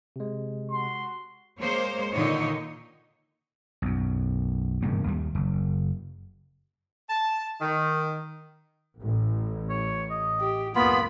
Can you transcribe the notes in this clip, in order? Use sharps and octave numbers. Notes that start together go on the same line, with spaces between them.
C3 G#3
F#4 C6
G#3 A#3 C5 C#5
A#2 D3 D#3 D#4 C#5 D#5
B1 F#2
E1 G2 C#3 A#3
D#2 G3
F#1
A5
D#3
A1
C#5
D#5
G4
C#2 F#2 A#3 B3 F4 G#4 B5